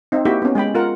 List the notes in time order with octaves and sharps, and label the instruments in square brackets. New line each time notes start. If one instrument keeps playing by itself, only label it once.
[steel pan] C4 D#4
A#3 E4 F#4 G4 E5
B3 C#4
G#3 G#4 G5 B5
F4 A#4 F#5